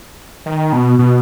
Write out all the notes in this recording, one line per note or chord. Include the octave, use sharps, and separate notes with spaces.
D#3
B2
B2